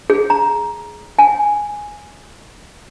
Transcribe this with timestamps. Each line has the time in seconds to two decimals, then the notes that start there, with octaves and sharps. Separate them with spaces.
0.10 G#4
0.30 A#5
1.19 G#5